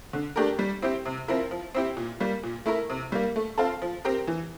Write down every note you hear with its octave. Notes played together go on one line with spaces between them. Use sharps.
D3
A3 D4 G4 A#4
G3
C4 E4 G4
C3
F3 C4 E4 A#4
F3
C4 E4 G4
A#2
G3 A#3
A#2
A3 E4 A#4
C3
G3 A#3
A3
C4 F4 A4
F3
C4 G4 A#4
E3